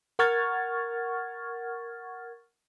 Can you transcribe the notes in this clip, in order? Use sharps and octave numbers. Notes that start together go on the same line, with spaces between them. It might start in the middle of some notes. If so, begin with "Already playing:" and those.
A#4 F#5 C#6 F6 G#6 A6